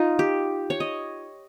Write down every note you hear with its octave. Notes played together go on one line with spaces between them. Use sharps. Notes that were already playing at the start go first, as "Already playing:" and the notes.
Already playing: D#4 F4
G4
C#5
D#5